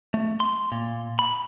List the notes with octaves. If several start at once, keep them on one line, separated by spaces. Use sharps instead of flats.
A3
C6
A#2
B5